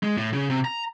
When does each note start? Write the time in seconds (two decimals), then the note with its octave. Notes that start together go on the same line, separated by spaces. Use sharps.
0.03 G#3
0.18 A2
0.33 C#3
0.50 C3
0.65 A#5